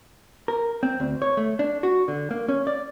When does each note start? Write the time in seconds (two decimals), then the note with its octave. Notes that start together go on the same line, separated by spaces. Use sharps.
0.48 A#4
0.83 C4
1.00 D2
1.22 C#5
1.37 A3
1.59 D4
1.83 F#4
2.08 D3
2.31 A#3
2.48 C#4
2.67 D5